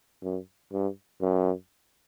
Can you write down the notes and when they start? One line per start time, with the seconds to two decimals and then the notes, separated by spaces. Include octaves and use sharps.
0.23 F#2
0.73 G2
1.22 F#2